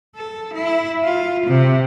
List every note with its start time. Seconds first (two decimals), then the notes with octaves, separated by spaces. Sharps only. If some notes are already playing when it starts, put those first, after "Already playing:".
0.16 A4
0.54 E4
1.04 F4
1.46 C3